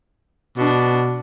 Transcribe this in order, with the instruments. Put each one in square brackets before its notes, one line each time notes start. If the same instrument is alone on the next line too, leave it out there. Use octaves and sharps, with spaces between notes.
[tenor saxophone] B2 [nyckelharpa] D4